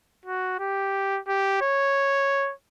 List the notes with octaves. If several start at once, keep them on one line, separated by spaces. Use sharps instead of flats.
F#4
G4
G4
C#5